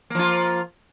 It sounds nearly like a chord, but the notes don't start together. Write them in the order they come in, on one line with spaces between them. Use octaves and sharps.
A#3 F3 F4